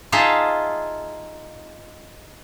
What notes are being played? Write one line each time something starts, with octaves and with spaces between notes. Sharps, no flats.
D#4 F4 G#4 E5 F5 A5